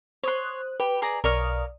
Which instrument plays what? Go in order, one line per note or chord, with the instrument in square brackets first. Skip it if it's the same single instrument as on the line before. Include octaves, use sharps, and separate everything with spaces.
[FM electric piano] C5 D#6 F#6 [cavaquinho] C#5 C6
[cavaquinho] G4 [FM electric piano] B4
[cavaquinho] G#4 D5 A#5
[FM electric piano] B1 D5 D#6 [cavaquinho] A#4 C#5 F5